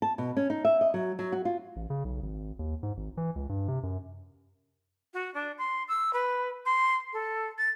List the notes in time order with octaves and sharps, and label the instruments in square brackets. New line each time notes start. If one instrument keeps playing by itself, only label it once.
[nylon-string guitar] A5
B2
C#4
D#4
E5
D#5
F#3
F#3
F#4
F4
[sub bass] A1
C#3
B1
G#1
D#2
G#2
G#1
E3
C#2
G2
C3
F#2
[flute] F#4
D4
C6
E6
B4
C6
A4
A6